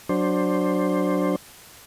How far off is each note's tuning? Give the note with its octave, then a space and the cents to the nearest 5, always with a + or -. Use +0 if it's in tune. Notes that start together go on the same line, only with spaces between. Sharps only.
F#3 +0 D4 +0 C5 +10